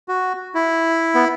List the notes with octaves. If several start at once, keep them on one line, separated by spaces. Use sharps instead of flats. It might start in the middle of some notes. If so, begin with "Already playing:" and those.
F#4
E4
B3